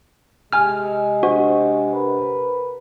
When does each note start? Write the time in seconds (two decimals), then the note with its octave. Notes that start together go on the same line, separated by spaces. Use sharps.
0.53 C3 G#3 G#5 F6
1.23 D4 F#4 C5 F#5
1.94 A#4 B4